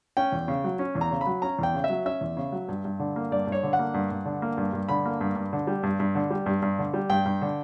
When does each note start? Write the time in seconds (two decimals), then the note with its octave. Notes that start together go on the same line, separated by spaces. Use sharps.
0.17 C#4 G5
0.32 E2
0.48 C#3
0.64 F#3
0.79 C#4
0.95 E2
1.01 A#5
1.11 C#3
1.21 B5
1.27 F#3
1.42 C#4 A#5
1.59 E2 G5
1.74 C#3
1.84 E5
1.89 F#3
2.05 C#4 E5
2.21 E2
2.37 C#3
2.52 F#3
2.68 G2
2.85 G2
2.99 D3
3.16 A#3
3.31 G2 D5
3.47 G2
3.52 C#5
3.63 D3
3.73 F#5
3.79 A#3
3.94 G2
4.11 G2
4.25 D3
4.42 A#3
4.57 G2
4.73 G2
4.89 D3 B5
5.05 A#3
5.21 G2
5.36 G2
5.53 D3
5.67 G3
5.83 G2
6.00 G2
6.15 D3
6.30 G3
6.46 G2
6.62 G2
6.79 D3
6.94 G3
7.10 G2 G5
7.25 G2
7.41 D3